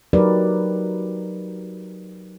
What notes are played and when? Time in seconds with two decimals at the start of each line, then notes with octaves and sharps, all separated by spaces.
0.13 F#3 D#4 G4 A#4 B4 D5